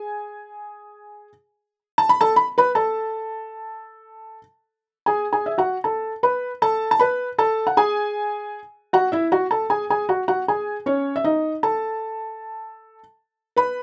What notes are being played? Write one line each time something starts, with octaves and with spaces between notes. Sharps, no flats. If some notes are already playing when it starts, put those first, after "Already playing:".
Already playing: G#4 G#5
A5
B5
A4 A5
B5
B4 B5
A4 A5
G#4 G#5
G#4 G#5
E5
F#4 F#5
A4 A5
B4 B5
A4 A5
A5
B4 B5
A4 A5
F#5
G#4 G#5
F#4 F#5
E4 E5
F#4 F#5
A4 A5
G#4 G#5
G#4 G#5
F#4 F#5
F#4 F#5
G#4 G#5
C#4 C#5
E5
D#4 D#5
A4 A5
B4 B5